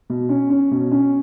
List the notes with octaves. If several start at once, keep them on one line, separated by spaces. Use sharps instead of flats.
B2
C#4
C#4
B2
C#4